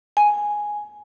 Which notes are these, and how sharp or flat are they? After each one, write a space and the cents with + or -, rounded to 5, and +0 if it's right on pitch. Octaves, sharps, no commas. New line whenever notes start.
G#5 +0